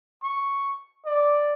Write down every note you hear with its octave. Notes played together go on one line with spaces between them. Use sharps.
C#6
D5